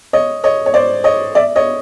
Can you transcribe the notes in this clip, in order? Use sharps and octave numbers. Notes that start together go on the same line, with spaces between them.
C#5 D#5
C#5 D#5
C#5
C5 D5
C#5 D#5
D5 E5
C#5 D#5